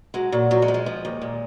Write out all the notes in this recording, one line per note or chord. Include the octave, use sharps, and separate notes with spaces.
F#3 G#3
A#2 F#3
F3 F#3
G#3
F3
G#3
F3
D#2
A#2